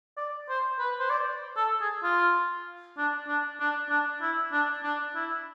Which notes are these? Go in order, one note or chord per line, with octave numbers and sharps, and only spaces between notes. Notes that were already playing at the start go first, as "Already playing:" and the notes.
D5
C5
B4
C5
D5
A4
G#4
F4
D4
D4
D4
D4
E4
D4
D4
E4